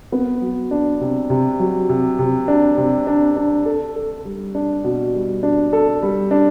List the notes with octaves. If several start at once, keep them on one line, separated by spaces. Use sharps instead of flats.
B3
F#3
D4
C3
C3
F#3
C3
C3
D4
C3
D4
D4
A4
A4
G3
D4
B2
G3
D4
A4
G3
D4